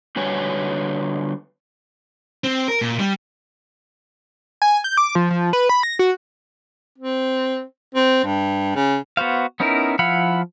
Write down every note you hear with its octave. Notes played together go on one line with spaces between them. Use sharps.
D3 G3 F#4 B4 C#5 G#5
C4
A#4
A#2
G3
G#5
G6
D6
F3
F3
B4
B5
A#6
F#4
C4
C4
G2
C#3
B3 F#4 C5 F5
B3 C#4 D#4 E4 A#4
F3 E4 F5 F#5 B5